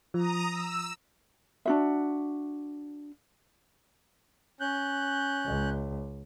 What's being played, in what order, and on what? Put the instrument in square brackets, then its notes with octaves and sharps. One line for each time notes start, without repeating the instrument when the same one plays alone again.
[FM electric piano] F3 [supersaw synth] A#5 D#6
[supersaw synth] E6
[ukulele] D4 F#4 E5
[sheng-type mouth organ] C#4 F#6 G6
[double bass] C#2